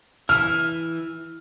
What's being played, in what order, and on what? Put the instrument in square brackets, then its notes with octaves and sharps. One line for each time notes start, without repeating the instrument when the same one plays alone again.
[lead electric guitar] E3 E4 [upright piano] F6